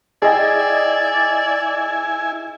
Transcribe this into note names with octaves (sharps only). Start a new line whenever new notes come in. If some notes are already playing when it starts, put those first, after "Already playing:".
E4 G#4 D5 D#5 G5 G#5